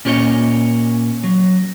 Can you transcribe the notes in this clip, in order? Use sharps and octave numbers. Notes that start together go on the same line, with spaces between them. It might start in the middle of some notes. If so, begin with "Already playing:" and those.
A#2 C#4 G4 C5 C#5 D#5
F#3